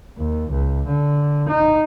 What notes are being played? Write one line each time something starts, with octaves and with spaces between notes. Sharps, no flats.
D#2
C#2
D3
D#4